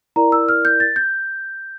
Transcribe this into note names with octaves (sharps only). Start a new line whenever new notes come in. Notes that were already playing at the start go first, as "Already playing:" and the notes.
E4 A#4 D5 A#5
E6
F6
G6
A6
G6